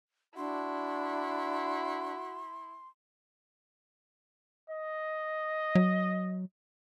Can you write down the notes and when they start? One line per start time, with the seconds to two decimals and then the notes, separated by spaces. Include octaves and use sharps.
0.37 D4 E4 F#4 C6
4.70 D#5
5.75 F#3